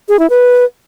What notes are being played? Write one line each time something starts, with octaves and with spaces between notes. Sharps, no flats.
G#4
E4
B4